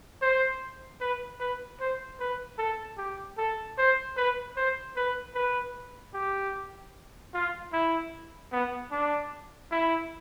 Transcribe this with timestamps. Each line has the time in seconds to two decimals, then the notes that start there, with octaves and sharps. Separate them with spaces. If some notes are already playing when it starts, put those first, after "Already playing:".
0.22 C5
1.01 B4
1.40 B4
1.80 C5
2.20 B4
2.58 A4
2.98 G4
3.37 A4
3.78 C5
4.17 B4
4.57 C5
4.96 B4
5.35 B4
6.14 G4
7.34 F4
7.73 E4
8.52 B3
8.91 D4
9.71 E4